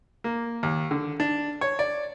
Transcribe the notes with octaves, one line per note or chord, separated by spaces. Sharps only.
A#3
D#2
D3
D4
C#5
D5